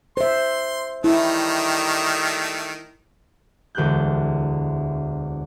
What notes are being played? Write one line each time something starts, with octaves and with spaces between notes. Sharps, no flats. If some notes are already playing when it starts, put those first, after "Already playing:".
C5 E5 C6
D#3 G3 A3 E4
E1 D2 G4 F#6 G6